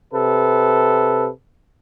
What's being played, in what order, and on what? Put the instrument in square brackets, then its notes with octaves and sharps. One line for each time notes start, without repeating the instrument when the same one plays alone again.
[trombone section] C3 A4 B4